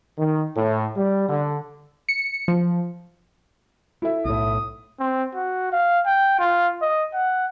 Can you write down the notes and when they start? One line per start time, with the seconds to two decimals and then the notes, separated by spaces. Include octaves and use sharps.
0.18 D#3
0.55 A2
0.95 G3
1.29 D3
2.09 C#7
2.48 F3
4.02 E4 A4 E5
4.25 B1 A2 D#6
5.00 C4
5.35 F#4
5.72 F5
6.06 G5
6.39 F4
6.82 D#5
7.14 F#5